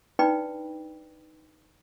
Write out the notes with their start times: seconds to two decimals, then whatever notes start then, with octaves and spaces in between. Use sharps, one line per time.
0.19 D4 D#4 B4 D5 G5 B5